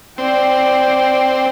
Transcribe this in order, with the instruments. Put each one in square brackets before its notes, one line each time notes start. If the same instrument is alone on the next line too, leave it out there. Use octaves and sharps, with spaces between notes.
[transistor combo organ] C4 [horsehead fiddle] D5 G5